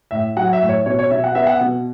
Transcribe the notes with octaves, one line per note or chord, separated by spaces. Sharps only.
A2 E5
F#3 F#5
E5
A2
C#5
B2 C#5
C#5
B2 E5
F#5
B3 E5
F#5
B2